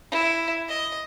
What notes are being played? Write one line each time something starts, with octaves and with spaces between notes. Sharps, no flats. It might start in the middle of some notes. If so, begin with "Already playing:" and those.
E4
D#5